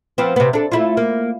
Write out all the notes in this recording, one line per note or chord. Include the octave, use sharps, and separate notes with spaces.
F3 B3 C4
C3 B3
D4 A4
A3 E4 F4
A#3